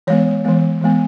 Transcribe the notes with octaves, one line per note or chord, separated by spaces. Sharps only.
E3 G#3 B3 C#5
E3 G#3 B3
E3 G#3 B3